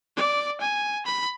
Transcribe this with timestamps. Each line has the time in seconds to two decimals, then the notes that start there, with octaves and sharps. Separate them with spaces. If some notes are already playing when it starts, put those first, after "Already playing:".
0.17 D5
0.61 G#5
1.06 B5